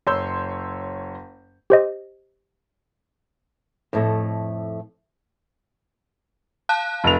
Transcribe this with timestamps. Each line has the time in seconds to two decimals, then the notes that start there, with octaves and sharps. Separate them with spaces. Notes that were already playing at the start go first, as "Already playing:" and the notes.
0.07 F#1 C#5 C6 E6 G6
1.70 G4 C5 D#5
3.93 F2 A2 A3
6.69 F5 A5 F#6
7.04 F1 F7